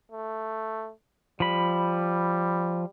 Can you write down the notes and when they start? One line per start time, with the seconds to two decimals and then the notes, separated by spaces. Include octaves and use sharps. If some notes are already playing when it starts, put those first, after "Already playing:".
0.12 A3
1.40 F3 G3 B5